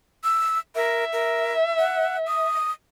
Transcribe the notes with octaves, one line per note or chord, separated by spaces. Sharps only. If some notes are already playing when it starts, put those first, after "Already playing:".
E6
A#4 E5
A#4
F#5
D#6